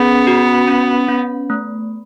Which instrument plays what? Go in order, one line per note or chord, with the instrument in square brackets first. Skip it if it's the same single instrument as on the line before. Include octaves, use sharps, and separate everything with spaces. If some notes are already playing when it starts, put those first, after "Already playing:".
Already playing: [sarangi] B3 [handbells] C#4 G#4
[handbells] F#4
C#4
C#4
A3